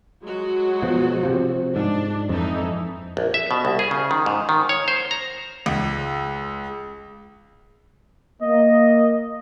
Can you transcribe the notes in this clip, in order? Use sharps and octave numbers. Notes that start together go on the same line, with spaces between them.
F#3 G#3 F#4
B2 F3
C3 F3
G#2 D4
F2 E3 D#4 A4
A#1
E5
B2
C2
G#4
C#3
D#3
G#2
D#3
C#5
C5
A#5
C#2
A#3 D#5